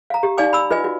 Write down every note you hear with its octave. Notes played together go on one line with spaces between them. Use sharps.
F5 A#5
G4
D#4 D5 F5 G#5 D6
B5 E6
F4 B4 D#5 G#5
F#4